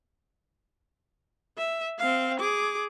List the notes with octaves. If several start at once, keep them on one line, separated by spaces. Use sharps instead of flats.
E5
C4 F5
G#4 D6